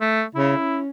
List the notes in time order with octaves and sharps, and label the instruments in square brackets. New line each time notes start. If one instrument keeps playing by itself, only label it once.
[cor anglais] A3
[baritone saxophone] C#3 [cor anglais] E4
[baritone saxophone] C#4